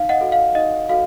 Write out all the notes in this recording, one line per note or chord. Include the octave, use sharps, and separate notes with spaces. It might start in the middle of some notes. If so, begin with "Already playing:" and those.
Already playing: D#4 F5
D#5 F#5
F#4 A4
F5
D#4 D#5
F#4 A4 F5